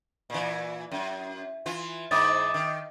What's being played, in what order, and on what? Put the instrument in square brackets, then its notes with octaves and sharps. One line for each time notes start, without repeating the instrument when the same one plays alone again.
[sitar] A#2 E3
F#2
E3 F4
[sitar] G#2 E3 D#4 [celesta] D6 D#6 A6
[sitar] D#3